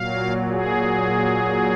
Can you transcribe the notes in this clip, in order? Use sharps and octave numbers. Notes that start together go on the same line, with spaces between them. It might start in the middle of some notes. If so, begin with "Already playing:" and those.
Already playing: A#2 F#3 F5
G#4